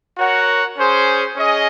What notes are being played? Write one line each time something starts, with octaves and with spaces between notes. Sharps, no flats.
F#4 A#4 C#5 F#5
C#4 G#4 C5
C#4 G#4 D#5